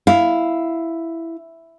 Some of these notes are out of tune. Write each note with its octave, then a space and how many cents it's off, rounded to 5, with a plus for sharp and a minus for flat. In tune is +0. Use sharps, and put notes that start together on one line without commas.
E4 +5 F5 +0